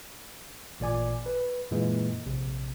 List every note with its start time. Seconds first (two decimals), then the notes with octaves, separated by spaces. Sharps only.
0.80 A1 A#2 D5 G#5 D6
1.26 B4
1.71 F#2 A#2 E3 G#3 A#3
2.26 A#1 C3